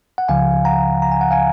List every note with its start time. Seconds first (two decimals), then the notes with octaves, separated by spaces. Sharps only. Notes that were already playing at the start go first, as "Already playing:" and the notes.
0.18 F#5
0.29 C#2 C#3 F3 F5 G#5
0.65 F#5 A#5
1.02 A#5
1.12 G#5
1.21 F#5
1.31 F5 G#5